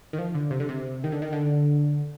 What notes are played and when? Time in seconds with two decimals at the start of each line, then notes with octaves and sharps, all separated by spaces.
0.13 D#3
0.19 F3
0.35 D3
0.51 C3
0.60 D3
0.69 C3
1.04 D#3
1.12 D3
1.22 D#3
1.33 D3